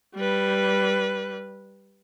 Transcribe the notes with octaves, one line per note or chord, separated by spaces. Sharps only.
G3 B4